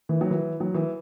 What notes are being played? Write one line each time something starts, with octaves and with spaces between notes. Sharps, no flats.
E3
F#3
E3
F#3
E3